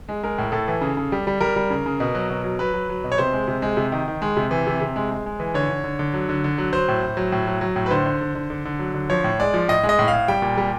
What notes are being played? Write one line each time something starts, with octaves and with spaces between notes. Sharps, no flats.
G#3
G#3 A#4
A2
A2 A4
E3
C#3
C#3
G3
G3
G3 A#4
G3
C#3
C#3
B2
F#3
B2
F#3
F#3 B4
F#3
F#3
B2
C#5
C3 C5
G#3
C3
G#3
C3
D#3
D#3
G#3
C3
E3
C3
C3
G#3
G#3
G#3
E3
D3 C#5
D3
D3
D3
F#3
D3
D3
F#3
F#3 C5
A2
A2
F#3
A2
F#3
F#3
A2
B4
D3 C5
D3
D3
D3
D3
D3
F#3
D3
F3 C#5
A2
G#3 D5
F3
A2 D#5
G#3
D#5
A2
F5
A2
G3 G5
A#2
G3